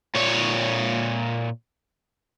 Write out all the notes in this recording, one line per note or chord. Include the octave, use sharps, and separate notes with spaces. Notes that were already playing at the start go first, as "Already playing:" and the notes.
A#2 C#5